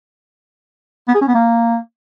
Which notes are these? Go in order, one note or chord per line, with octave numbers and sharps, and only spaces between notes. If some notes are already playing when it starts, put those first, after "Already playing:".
B3
G#4
C#4
B3
A#3